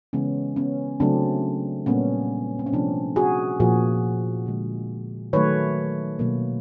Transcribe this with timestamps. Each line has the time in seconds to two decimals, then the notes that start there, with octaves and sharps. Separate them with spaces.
0.13 C#3 E3 G#3 B3 C#4
0.56 B3 C#4
1.00 C#3 F#3 A3 C4 D4
1.86 A#2 G3 A#3 B3 C#4
2.59 C4
2.66 C#4
2.73 C3 F3 A3 C4 D4
3.16 F#4 G#4
3.60 A#2 F3 A#3 F#4 G#4
4.46 D3 F3 G#3
5.33 D#3 F#3 A3 B4 C#5
6.19 B2 F#3 A#3